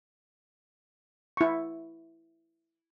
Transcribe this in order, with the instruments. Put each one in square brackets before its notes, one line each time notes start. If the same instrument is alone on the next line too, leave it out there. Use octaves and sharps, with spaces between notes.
[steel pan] E4 C#6